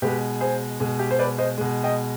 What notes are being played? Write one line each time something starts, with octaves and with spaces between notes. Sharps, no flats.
B2 G#3 G4 B4
G#4 C5
B2 G#3
G4
C5
B4 D5
C5 D#5
B2 G#3
D#5 G5